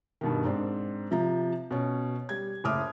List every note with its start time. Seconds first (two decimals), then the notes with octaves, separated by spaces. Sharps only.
0.21 G2 B2 D#3
0.44 G#2 C4 D4
1.11 C3 F3 A#5
1.71 B2 C#4
2.29 G3 G#6
2.64 F#1 A2 D6 D#6 F6